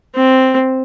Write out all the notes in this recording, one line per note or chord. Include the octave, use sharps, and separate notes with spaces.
C4